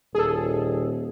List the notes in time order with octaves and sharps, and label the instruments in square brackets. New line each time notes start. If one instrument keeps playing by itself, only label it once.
[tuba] D#1 [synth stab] G#4 A4